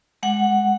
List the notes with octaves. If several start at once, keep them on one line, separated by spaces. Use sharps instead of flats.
G#3 F#5